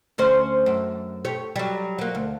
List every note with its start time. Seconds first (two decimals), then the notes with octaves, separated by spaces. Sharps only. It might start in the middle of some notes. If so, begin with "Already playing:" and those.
0.18 D2 C#4 C5
0.66 F#2
1.25 G4 C#5
1.56 F#3 G3
1.98 F#3 A#3
2.15 D2